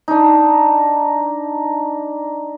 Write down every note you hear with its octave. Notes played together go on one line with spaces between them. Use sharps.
D4 D#4